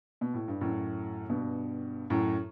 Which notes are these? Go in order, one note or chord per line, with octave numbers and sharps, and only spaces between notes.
B2
A2
G2
F#2 A2
G2 B2
F#2 A2